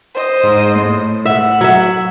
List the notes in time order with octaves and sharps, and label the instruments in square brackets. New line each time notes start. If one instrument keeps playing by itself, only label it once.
[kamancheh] C5 D#5
[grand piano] G#2
A2
[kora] E5 [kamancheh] F#5
[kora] F#3 E5